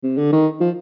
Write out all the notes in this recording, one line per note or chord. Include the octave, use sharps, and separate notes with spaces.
C3
D3
D#3
F3